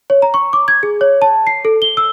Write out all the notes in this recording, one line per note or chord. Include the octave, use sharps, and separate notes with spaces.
C#5
A#5
C#6
D6
G#6
G#4
C#5
A5
C7
A4
G7
E6